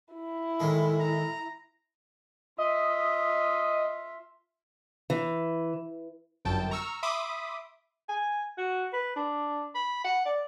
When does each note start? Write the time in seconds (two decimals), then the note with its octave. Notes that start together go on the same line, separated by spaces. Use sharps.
0.14 E4
0.60 A2 D#3 G#3
1.00 A#5
2.58 F4 D#5 E5
5.10 E3
6.45 G1 F#2 G5 A5
6.71 A#5 C#6 E6 F6
7.03 E5 B5 C6 D6 D#6
8.09 G#5
8.58 F#4
8.93 B4
9.16 D4
9.75 B5
10.04 F#5
10.25 D5